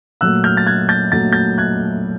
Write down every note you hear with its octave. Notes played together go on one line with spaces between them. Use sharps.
A#2 F#3 A3 E6 F#6
F6 G6
A6
F#6 G#6
G6 A6
A#2 F#3 A3 A6
G6 A6
F#6 G#6